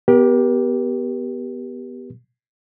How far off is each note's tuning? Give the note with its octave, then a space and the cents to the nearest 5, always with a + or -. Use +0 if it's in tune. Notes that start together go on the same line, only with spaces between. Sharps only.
B3 +0 G4 +0 A#4 +40